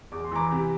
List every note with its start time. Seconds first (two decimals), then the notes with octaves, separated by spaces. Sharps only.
0.12 E2 D6
0.25 C6
0.32 E3 A#5 D6
0.51 C3